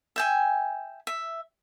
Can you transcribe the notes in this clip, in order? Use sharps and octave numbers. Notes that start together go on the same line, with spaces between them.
E5 G5 G#5
E5